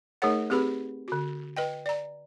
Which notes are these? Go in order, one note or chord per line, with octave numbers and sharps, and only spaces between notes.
A3 D#4 G#4 A#4 C#5 F#5
C4 G4 G#4 B4 B5
D3 F#4
B4 D#5 G5
D5 A#5